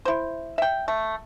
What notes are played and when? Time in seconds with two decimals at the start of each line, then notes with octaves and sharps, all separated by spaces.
0.05 E4 C5
0.58 E5 G5
0.88 A3